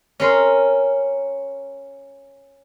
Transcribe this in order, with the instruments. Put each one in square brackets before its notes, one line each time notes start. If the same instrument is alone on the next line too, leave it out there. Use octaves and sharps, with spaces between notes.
[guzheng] C#4 A#4 C6